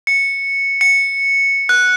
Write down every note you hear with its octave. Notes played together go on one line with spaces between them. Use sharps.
C#7
C#7
F#6